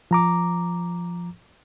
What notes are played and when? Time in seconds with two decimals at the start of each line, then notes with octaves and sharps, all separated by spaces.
0.11 F3 A#5 D6